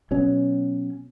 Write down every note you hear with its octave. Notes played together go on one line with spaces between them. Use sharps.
B2 F#3 C#4